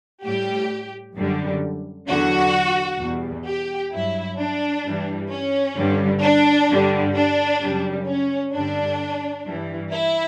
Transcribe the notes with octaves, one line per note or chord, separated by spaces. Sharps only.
A2 G3 G4
F#2 D3 G3
E2 D3 F#3 F#4
E2 B2 G3
G4
G2 F#3 E4
D4
G2 E3 G3
C#4
G2 D3 G3
D4
G2 D3 G3
D4
F#2 C#3 G3
C#4
G2 D3 G3 D4
G2 E3 G3
E4